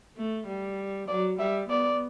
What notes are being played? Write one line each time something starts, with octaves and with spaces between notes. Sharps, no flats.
A3
G3
F#3 D5
G3 E5
B3 D5